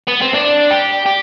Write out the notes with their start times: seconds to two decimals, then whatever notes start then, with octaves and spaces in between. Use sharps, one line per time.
0.08 B3
0.22 C4
0.35 D4
0.71 G4
1.06 G4